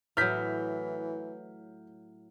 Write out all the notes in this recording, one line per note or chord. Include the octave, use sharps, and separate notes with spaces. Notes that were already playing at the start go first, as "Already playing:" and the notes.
A2 E3 F#3 F6 G6 B6